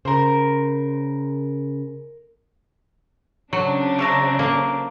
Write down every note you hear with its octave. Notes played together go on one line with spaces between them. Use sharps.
C#3 A#4 C5
C#3 F#3 C4 D4
C#5 E5 A#5
A#3